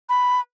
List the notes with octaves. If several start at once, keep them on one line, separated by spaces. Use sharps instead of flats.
B5